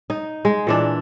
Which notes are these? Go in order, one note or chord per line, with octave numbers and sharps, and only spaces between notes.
D#4
G#3
A#2 E3 D4